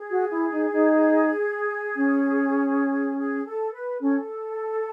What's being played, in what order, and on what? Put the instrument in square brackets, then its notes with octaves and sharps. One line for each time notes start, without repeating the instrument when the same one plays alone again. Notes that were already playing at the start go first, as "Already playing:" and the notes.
Already playing: [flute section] G#4
[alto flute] F#4
E4
D#4
D#4
C#4
[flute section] G#4
A4
B4
[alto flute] C#4 [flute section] A4